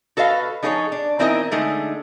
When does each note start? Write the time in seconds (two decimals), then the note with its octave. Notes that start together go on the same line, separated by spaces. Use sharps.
0.17 F#4 A4 B4 D#5 F5
0.62 F3 D#4 G#4 A4 B4 C#5
0.92 D4
1.19 E3 C4 D#4 E4 A#4 D#5
1.51 D3 G#3 A3 D#4